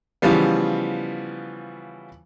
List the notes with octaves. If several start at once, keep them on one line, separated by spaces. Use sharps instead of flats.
C#3 E3 F3 G3 B3